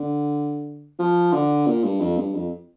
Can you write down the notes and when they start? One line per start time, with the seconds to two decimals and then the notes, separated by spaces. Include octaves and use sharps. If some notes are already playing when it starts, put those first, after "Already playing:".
Already playing: D3
0.99 F3
1.33 D3
1.67 A#2
1.84 G2
2.00 F2
2.17 G2
2.35 F2